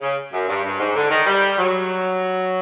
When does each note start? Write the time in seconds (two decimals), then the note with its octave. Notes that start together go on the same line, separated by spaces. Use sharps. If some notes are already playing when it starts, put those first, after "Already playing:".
0.01 C#3
0.32 F#2
0.48 G2
0.63 G2
0.79 G#2
0.95 D3
1.10 D#3
1.26 G3
1.58 F#3